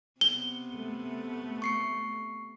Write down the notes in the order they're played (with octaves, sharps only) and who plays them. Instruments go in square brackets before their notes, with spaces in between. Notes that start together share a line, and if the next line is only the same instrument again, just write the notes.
[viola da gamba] C3 B3 [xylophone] G7
[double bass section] A3
[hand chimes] C#6 C7 C#7